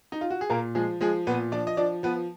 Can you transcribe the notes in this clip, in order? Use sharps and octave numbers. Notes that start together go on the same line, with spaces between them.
D#4
F4
F#4
G#4
A#2 A#3 A#4
F3 G#3 G#4
F3 G#3 G#4
A#2 B3 B4
F3 D4 D5
D#5
F3 D4 D5
F3 B3 B4